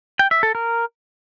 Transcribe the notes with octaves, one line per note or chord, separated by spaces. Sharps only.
G5
E5
A4
A#4